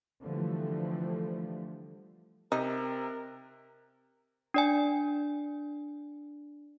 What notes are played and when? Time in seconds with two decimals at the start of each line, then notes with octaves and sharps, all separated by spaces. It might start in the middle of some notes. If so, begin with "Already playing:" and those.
0.23 D3 E3 F3 G3 A3
2.52 C3 D#4 A#4
4.54 D4 D5 G#5